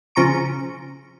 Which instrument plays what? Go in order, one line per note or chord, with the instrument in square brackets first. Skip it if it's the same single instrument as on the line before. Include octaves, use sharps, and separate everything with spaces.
[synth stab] C#3 F3 A#5 C#6 D7